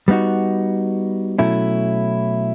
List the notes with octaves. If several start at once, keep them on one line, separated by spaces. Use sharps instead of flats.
G3 B3 D#4 F#4
B2 F#3 A3 C#4 E4